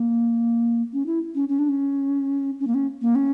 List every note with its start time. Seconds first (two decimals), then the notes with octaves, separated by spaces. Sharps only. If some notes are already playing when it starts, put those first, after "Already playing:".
Already playing: A#3
0.93 C#4
1.06 E4
1.35 C#4
1.49 C#4
1.59 D4
1.69 C#4
2.60 C#4
2.67 A#3
2.74 C#4
3.01 A#3
3.15 C#4